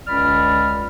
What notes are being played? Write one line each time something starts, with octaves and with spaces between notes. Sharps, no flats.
C#2 D3 C#4 D5 B5 F6